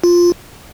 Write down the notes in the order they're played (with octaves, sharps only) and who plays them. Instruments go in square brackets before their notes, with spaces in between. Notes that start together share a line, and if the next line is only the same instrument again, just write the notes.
[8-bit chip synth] F4